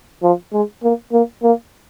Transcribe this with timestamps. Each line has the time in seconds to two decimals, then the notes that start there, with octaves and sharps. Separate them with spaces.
0.23 F3
0.53 G#3
0.83 A#3
1.12 A#3
1.43 A#3